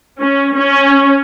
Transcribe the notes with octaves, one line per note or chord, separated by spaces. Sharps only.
C#4
C#4